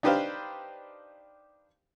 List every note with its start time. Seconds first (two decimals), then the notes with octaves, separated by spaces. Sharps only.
0.03 D4 D#4 G4 B4 C5 F5